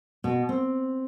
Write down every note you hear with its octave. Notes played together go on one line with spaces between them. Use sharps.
B2
C4